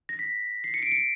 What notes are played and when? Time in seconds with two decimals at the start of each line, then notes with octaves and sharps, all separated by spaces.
0.09 A#6
0.19 B6
0.64 C7
0.74 C#7
0.83 D7
0.92 C#7